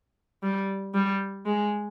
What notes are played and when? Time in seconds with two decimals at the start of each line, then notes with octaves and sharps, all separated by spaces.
0.43 G3
0.94 G3
1.46 G#3